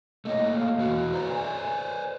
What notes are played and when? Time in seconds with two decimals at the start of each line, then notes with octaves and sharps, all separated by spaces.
0.25 A3 A#3 C#5 D#5
0.50 F5
0.78 E2 E3 F#4
1.13 B4 C5 D5 A#5
1.28 G#5